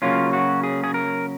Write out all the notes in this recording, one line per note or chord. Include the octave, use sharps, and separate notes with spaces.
C#3 F#3 A#3 C#4 F4
F#4
G#4
G#4
A#4